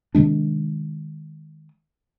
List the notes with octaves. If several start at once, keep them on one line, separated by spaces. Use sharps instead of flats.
C3 D#3 G#3 D4